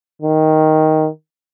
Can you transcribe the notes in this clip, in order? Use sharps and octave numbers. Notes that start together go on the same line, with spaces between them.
D#3